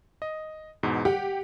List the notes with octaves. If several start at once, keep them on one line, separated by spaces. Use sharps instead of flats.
D#5
E2 G#2 B2
G4 F#5